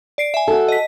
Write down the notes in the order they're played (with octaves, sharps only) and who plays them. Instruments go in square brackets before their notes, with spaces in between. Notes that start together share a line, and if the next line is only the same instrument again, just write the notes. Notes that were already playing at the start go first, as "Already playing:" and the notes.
[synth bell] D5 C7 D7
E5 G#5
[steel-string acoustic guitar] F#4 A4
[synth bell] D#5 B6